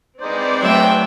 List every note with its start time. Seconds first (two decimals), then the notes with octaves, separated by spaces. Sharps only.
0.21 G#3 C4 D#4 B4 C5 D5
0.62 F#3 A3 E5 G5